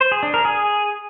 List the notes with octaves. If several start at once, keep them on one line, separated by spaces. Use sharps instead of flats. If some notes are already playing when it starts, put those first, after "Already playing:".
C5
G#4
D4
A#4
G#4